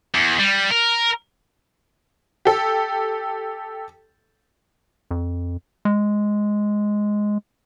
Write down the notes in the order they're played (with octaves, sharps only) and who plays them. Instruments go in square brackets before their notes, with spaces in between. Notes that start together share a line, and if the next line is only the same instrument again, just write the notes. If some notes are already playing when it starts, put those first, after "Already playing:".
[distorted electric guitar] E2
G3
A#4
[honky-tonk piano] G4 A4
[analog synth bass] F2
G#3